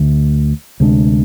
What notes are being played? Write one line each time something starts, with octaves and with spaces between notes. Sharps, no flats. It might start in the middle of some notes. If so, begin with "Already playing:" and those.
Already playing: D2 D3 A3
D2 C3 G#3 D4